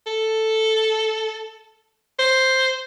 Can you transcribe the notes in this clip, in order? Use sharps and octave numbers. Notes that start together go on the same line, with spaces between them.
A4
C5